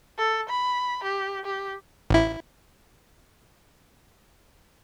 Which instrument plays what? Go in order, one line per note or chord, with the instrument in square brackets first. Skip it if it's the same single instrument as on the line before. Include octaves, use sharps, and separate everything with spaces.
[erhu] A4
B5
G4
G4
[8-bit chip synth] A1 E4